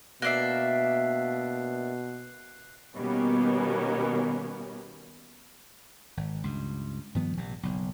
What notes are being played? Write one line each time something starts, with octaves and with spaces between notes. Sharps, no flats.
B2 A#3 D4 E5 F#6 C7
B2 D#3 G3 A#3 B3 C#4
G#1
C#2 G2
G2 D#3 F3 B3
A#1 C3
F#1 B1